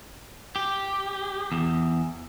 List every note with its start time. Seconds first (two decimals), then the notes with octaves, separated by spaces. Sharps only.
0.56 G4
1.52 E2